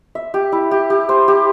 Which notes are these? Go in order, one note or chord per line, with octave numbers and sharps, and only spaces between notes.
E5
G4
E4
G4
G4
C5
G4